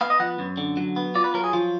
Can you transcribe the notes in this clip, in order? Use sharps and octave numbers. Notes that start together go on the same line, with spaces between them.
B3 F5
D#5
F3 F#5
F#2
D3
F#3
B3
F4 D5
B4
F#3 A#4
G#4
F3 F4